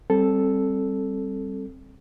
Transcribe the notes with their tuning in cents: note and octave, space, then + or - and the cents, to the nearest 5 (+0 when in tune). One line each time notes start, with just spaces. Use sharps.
G3 +0 C4 +20 A4 -5